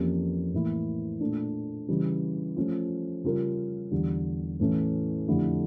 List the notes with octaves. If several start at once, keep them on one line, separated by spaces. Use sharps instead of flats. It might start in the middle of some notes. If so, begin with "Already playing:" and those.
Already playing: F2 E3 A#3 C#4 G4
A2 E3 A#3 E4
A#2 A3 D4
C#3 E3 G3
F3 A3 C#4 F4
C#3 G3 C#4 F4 A#4
E2 D3 G3
A2 E3 A3 C#4
F2 D3 A3 E4 G4